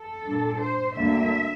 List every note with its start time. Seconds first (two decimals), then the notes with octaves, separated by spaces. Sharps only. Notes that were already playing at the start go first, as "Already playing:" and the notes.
Already playing: A4
0.26 A#2 G3 D4
0.61 C5
0.96 D2 D3 G3 A#3 D4 E5